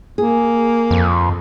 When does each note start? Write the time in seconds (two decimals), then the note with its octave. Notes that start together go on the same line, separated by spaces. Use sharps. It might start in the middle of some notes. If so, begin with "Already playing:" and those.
0.18 A#3 G#4
0.91 F2